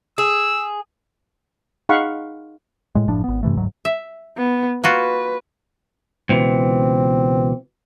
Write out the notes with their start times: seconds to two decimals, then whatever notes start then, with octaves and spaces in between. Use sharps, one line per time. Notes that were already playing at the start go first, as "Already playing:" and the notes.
0.18 G#4 E6
1.89 D#4 G#4 F5 F#5 B5 C#6
2.95 A2 G#3
3.08 F#1 A2 F3 D4
3.24 G#1 B3
3.43 G2 C3 E3 A3
3.57 F#1 D2 G#2 F#3
3.85 E5
4.37 B3
4.84 A#3 F4 F#4 B4
6.29 C#2 B2 E3 C4